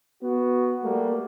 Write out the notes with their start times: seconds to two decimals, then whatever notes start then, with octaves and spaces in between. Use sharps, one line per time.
0.23 B3 F#4
0.83 G3 A3 A#3